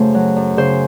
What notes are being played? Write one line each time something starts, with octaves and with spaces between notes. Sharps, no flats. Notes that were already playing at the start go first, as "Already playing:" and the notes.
Already playing: F#2 C#3 A3 C5
F#3
F#2
C#3 C5